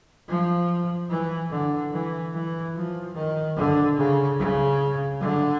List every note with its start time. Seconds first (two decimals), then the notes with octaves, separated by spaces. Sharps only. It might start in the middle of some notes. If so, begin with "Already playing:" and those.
0.28 F3
1.09 E3
1.50 D3
1.93 E3
2.33 E3
2.75 F3
3.15 D#3
3.56 D3
3.97 C#3
4.39 C#3
5.20 D3